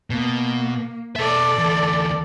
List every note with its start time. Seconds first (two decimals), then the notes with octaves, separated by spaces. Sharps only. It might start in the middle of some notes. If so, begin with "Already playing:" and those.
0.10 B2 A#3
1.16 B2 A4 D5 E5
1.58 D2 E3